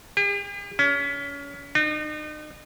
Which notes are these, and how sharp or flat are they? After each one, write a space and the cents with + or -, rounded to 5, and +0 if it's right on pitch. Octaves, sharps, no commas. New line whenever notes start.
G4 +45
C#4 +30
D#4 -40